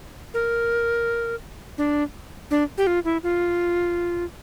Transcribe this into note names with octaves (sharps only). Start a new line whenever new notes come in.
A#4
D4
D4
G4
F4
E4
F4